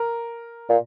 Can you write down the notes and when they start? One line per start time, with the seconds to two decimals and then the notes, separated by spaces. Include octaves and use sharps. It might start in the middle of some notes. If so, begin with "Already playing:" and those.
Already playing: A#4
0.69 A#2